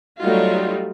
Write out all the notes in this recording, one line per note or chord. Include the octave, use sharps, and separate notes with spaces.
F#3 G3 A3 D#4 F4 F#4